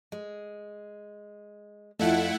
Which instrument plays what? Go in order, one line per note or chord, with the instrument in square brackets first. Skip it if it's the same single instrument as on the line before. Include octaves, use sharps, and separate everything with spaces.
[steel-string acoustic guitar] G#3
[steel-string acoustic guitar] F2 F4 [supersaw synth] A3 E4 F#5